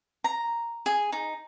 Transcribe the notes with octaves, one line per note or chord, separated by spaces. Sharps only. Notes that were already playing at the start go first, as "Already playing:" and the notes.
A#5
G#4
D#4